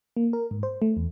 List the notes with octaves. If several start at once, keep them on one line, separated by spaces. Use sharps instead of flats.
A#3
A#4
G#2
C5
A3
E2